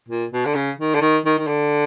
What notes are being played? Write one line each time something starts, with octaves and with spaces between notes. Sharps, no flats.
A#2
B2
D3
C#3
D#3
D3
D#3
D#3
D#3
D3